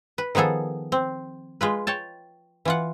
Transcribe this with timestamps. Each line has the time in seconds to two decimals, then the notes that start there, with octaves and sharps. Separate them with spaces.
0.18 B4
0.35 D#3 F3 B3 G#4 A4
0.92 C4
1.61 G#3 F4 B4
1.87 C#5 G5 A5
2.65 E3 F4 F#5